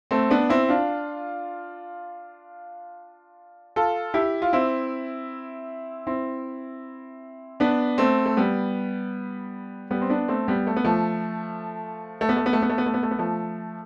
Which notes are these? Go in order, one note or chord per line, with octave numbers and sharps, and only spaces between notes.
A3 C4
B3 D4
C4 E4
D4 F4
F4 A4
E4 G4
F4
C4 E4
C4 E4
B3 D4
A3 C4
A3
G3 B3
G3 B3
C4
B3 D4
A3 C4
G3 B3
A3
B3
F3 A3
A3
B3
A3
B3
A3
B3
A3
B3
A3
B3
A3
B3
F3 A3